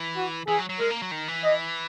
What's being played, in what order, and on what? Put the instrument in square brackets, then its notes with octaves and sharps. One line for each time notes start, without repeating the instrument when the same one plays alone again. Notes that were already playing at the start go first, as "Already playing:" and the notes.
Already playing: [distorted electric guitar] E3
[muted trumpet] F#4
[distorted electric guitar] E3 [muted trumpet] G#4
[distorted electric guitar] F#3
F#3
[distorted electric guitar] G#3 [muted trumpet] A#4
[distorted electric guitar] A#3
F#3
D#3
E3
[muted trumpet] D#5